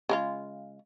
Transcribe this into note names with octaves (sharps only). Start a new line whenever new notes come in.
C#3 G#3 F4